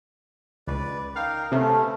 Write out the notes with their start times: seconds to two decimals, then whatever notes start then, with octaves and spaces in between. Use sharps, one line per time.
0.67 C#2 B4 D5
1.16 D#4 A#4 F5 G5
1.52 C3 A3 B3 C#4